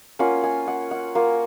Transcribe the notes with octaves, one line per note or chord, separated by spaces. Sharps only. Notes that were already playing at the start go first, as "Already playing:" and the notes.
A#3 C#4 F4 F#5
G#5
F#5
F#5
A#3 F4